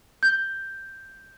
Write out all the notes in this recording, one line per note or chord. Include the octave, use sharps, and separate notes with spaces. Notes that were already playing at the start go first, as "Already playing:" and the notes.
G6